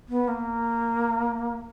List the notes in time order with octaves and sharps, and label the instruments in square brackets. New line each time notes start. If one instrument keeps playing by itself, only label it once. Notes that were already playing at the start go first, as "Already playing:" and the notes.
[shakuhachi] B3
A#3